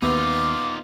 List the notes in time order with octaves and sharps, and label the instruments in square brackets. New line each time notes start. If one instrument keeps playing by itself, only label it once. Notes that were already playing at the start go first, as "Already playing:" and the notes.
[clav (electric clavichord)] D#2 E5 [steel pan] B3 [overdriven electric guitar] D#4 F4 [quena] D6